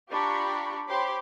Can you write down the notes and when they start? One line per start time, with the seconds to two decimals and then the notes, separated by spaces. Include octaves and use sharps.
0.11 D4 F4 G4 A#5 B5 C#6
0.88 G4 C5 C#5 B5 C6 D6